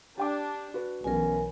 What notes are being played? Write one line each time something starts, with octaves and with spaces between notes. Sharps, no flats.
D4 G4 G5 D6
F#4 B4
B1 E3 B3 C#4 A#4 G#5